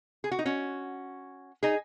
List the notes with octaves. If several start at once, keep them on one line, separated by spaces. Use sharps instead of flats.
G#4
F#4
D#4
C#4 F#4
D#4 G#4